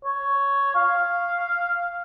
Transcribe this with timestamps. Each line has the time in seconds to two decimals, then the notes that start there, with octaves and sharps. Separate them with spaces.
0.05 C#5
0.75 F5